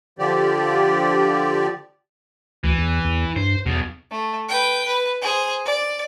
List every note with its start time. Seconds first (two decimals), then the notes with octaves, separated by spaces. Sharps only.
0.19 D3 F3 G4 D5
2.64 D2 E3
2.78 E2
3.04 E2
3.36 G2 C5
3.66 B1 E2 B2
4.11 A3
4.49 B4 G5
4.85 B4
5.22 G#4 C5
5.66 D5